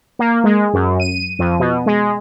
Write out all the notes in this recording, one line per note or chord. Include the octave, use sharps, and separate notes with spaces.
A#3
G#3
F#2
D#7
F2
B2
G#3